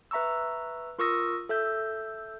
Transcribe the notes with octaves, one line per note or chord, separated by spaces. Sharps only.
B4 E5 A#5 C#6 E6
F4 A#4 C#6 D#6 E6 A#6
A4 E5 E6 G6